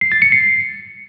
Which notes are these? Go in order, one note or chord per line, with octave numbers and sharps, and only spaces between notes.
C7
A6
C#7
C7